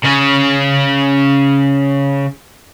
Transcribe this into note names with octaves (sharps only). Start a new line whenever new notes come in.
C#3 C#4